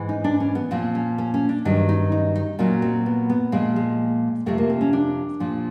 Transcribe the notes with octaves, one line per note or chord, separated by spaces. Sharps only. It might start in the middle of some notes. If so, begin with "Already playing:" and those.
Already playing: G#2 E3
D#4
D4
C#4
B3
A#2 F3 C4
C#4
C#4
C#4
D4
G2 D#3 F#3 D4
D#4
D#4
D#4
A#2 F#3 C#4
C4
B3
B3
A#2 F3 G#3
G#3
F2 C3 F3 A3
A#3
C4
C#4
D4
A#2 F3